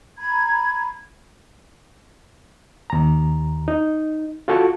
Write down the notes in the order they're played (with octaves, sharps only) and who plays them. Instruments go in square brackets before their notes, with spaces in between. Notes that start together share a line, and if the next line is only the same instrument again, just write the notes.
[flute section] A#5 B5 G#6
[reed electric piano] D#2 A#5
D#4
F4 F#4 A4 A5 C#6